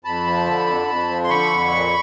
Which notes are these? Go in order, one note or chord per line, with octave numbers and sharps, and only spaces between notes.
F2 A5 B5
F3
D3
F2
F2
F3
C6
D3 B5 C#6
F2
A#2